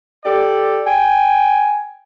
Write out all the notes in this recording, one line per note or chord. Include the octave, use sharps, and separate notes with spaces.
G4 A4 D5
G5 G#5